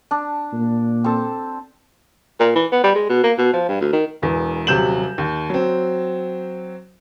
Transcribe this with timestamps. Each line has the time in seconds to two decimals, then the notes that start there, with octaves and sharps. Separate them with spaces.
0.11 D4
0.53 A#2
1.04 C4 A4
2.40 A#2
2.56 E3
2.72 B3
2.84 G3
2.96 G#3
3.09 B2
3.24 A#3
3.38 B2
3.53 F3
3.68 G2
3.81 D2
3.93 D#3
4.22 E1 E2 E3
4.67 D#1 C3 F#3 G6 E7 F#7
5.18 D#2
5.50 F#3 C4